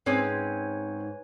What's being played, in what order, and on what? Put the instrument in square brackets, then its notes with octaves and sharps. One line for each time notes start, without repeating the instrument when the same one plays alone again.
[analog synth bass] G#2 [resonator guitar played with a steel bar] C4 C#4 G#4 [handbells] B4 C#5 G#5